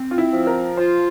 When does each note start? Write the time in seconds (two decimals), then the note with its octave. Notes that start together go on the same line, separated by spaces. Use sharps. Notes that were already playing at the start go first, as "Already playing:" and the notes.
Already playing: C4
0.11 F4
0.18 E4
0.33 F3
0.47 A#4
0.77 F4 C5